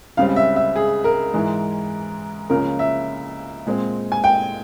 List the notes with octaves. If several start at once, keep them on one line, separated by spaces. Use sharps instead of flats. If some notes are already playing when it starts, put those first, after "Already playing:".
C#2 C#3 G3 C4 F5
E5
E5
G#4
A#4
G#2 E3 G#3
C#2 C#3 F3 A#3 C#4 A#4
E5
A#2 G#3 C4
G#5
G5